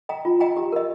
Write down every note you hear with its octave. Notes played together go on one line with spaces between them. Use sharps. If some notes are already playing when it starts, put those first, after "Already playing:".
D#5 G5 A#5
F4
D#5 G5 A#5
G4
A#4 D#5